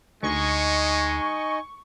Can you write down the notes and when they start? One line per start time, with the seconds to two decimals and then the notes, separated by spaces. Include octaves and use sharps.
0.23 D2 G#3 D#4 D#5 G#5 C#6